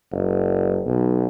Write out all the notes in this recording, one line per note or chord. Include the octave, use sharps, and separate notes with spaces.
F#1
B1